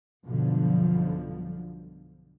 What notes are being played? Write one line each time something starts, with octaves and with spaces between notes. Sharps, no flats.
B1 G2 B2 D3 F3